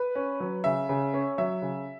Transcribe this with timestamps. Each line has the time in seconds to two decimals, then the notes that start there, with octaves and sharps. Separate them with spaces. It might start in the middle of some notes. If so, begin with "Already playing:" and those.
Already playing: B4
0.15 C#4
0.40 F#3
0.64 C#3 E5
0.89 C#3
1.14 C#4
1.38 F#3 E5
1.62 C#3